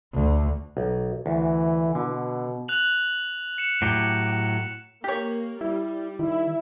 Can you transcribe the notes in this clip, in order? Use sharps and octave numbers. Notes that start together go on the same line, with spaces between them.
D2
B1
D2 E3
B2 D3
F#6 F7 F#7
C#7 E7
A2 F#3 G4
A#3 G4 C#5
G3 E4
D#3 E4